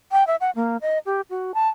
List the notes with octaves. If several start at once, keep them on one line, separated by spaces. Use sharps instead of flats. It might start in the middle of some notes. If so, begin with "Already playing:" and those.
G5
E5
F#5
A#3
D#5
G4
F#4
A5